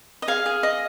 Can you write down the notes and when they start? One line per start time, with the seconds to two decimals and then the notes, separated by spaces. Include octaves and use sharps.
0.22 D#5
0.28 G#4 F5
0.46 G#4
0.63 D#5